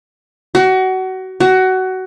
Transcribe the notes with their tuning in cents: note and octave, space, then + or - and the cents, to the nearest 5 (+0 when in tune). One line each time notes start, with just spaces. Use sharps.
F#4 +25
F#4 +20